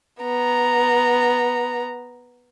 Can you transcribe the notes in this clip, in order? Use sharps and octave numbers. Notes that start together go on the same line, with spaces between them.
B3 A#5